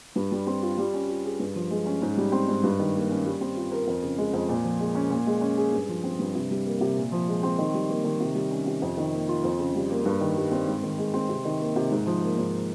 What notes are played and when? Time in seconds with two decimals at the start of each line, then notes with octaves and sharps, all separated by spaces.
0.16 G2
0.31 G3
0.47 C4
0.62 F4
0.78 G3
0.94 C#4
1.09 F4
1.24 G#4
1.39 G2
1.55 F3
1.71 G#3
1.86 C#4
2.02 G#2
2.17 G3
2.32 C4
2.48 G#2
2.63 G2
2.79 D#3
2.94 A#3
3.10 C#4
3.25 G3
3.41 C4
3.56 F4
3.72 A#4
3.87 F2
4.03 C#3
4.18 G#3
4.33 F2
4.49 A#2
4.64 F3
4.79 G#3
4.95 C#4
5.10 A#2
5.27 G#3
5.41 C#4
5.58 G#4
5.73 G2
5.88 F3
6.04 C4
6.19 G2
6.35 C3
6.50 G3
6.65 A#3
6.81 C3
6.97 A#2
7.12 F3
7.28 G#3
7.43 C4
7.58 D#3
7.74 G3
7.90 A#3
8.04 D#3
8.20 C3
8.35 G3
8.51 C#4
8.66 C3
8.82 F2
8.97 D#3
9.12 A#3
9.28 F4
9.43 F2
9.59 C#3
9.75 G3
9.90 A#3
10.06 G2
10.21 D#3
10.37 G3
10.52 C4
10.67 G#2
10.83 D#3
10.98 G#3
11.14 C4
11.29 C3
11.45 D#3
11.60 A#3
11.76 C3
11.91 G#2
12.06 F3
12.22 A#3
12.38 G#2